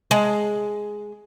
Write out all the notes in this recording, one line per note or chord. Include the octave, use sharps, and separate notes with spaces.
G#3